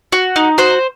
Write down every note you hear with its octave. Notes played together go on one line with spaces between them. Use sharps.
F#4
D#4
F#4 C5